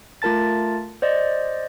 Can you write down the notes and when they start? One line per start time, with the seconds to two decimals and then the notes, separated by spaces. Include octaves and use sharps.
0.22 A3 F4 A#4 A5 A6
1.02 C5 D5 D#5